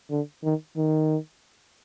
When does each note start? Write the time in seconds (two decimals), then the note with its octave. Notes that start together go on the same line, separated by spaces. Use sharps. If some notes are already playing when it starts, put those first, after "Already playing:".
0.11 D3
0.44 D#3
0.77 D#3